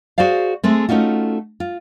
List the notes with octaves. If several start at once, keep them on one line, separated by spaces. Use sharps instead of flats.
F#4 G#4 C5 D5 F5
G#3 A3 C4
A3 C#4 D#4 F4 F#4
F4